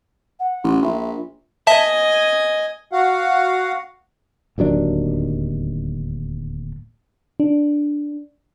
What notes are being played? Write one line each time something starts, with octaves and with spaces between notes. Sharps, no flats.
F#5
A1
A#1 E5
D#5 E5 G#5 A5
F#4 F5 F#5
D1 D#2 F#3 D4
D4